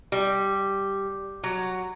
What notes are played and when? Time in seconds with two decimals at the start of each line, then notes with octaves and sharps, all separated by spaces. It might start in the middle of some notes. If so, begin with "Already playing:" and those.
0.12 G3
1.43 F#3